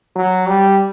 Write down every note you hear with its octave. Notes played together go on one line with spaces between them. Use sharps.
F#3
G3